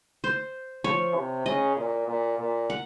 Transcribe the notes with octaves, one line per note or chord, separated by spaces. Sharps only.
C5
F3 C#5
C3
C#3 D#5
A#2
A#2
A#2
F#5